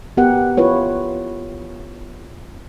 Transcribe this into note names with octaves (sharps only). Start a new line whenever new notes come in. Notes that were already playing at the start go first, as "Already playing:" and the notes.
B3 G4 A#4 F#5
E4 F4 B4 C#5